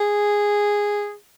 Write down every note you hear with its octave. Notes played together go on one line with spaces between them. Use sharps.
G#4